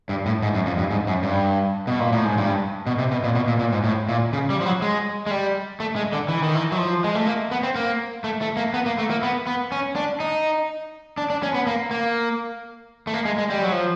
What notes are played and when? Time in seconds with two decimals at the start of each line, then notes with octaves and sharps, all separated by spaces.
0.09 G2
0.26 A2
0.42 G#2
0.54 F#2
0.66 F2
0.78 G2
0.91 G#2
1.07 F#2
1.23 G2
1.87 B2
2.00 A#2
2.12 A2
2.25 G#2
2.37 G2
2.87 B2
2.99 C3
3.11 B2
3.24 A#2
3.35 B2
3.48 A#2
3.59 A#2
3.72 G#2
3.84 A2
4.09 A#2
4.33 C#3
4.50 G3
4.61 F3
4.66 F#3
4.82 G#3
5.27 G#3
5.31 G3
5.80 A3
5.96 G#3
6.13 D3
6.28 E3
6.43 D#3
6.55 E3
6.72 F#3
6.78 F3
7.04 G#3
7.15 A3
7.27 A#3
7.51 B3
7.63 C4
7.76 A#3
8.24 A3
8.41 A3
8.57 A#3
8.74 B3
8.86 A#3
8.98 A3
9.10 A#3
9.23 B3
9.47 B3
9.72 C#4
9.96 D4
10.20 D#4
11.17 D4
11.30 D4
11.43 C#4
11.54 B3
11.67 A#3
11.91 A#3
13.07 A3
13.14 A#3
13.25 G#3
13.38 G#3
13.50 G3
13.62 F#3
13.72 F3